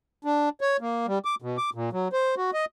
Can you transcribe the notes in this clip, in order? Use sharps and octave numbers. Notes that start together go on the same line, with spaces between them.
D4
C#5
A#3
G3
D6
B2
D6
A#2
F#3
C5
F#4
D#5